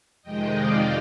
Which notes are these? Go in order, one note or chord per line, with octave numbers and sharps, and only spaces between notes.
F2 C3 D#3 G#3 D#5 G5
D5 F5